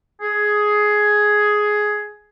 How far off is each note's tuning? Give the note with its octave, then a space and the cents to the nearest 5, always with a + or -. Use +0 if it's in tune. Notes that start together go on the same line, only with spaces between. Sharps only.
G#4 +10